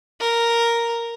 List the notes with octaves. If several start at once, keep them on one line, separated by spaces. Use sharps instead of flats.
A#4